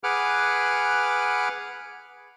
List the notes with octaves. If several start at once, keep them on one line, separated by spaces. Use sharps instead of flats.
G#4 B4 F#5 D6 F6